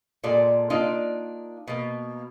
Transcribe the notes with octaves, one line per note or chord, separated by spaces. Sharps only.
A#2 G#3 A4 D5
A#3 D4 D#4 F4
B2 A#3